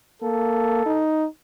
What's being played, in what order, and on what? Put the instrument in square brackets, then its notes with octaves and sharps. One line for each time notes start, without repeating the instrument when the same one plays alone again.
[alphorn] A#3 [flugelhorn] A4
[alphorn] D#4